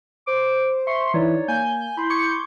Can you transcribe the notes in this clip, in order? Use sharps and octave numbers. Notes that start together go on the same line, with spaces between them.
C5 D6
E5 C6 C#6
E3 D#4 C#5 D5
A#3 G#5 G6
E4 B5 C6
C#6 D6 G#6 C#7